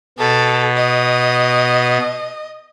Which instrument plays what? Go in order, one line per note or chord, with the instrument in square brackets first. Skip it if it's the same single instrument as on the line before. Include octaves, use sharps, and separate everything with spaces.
[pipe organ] B2 [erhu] A4
[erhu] D#5